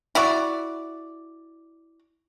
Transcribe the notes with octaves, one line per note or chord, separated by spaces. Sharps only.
E4 F#4 D5